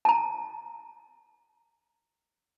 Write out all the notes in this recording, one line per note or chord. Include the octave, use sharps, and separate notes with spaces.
A5 A#5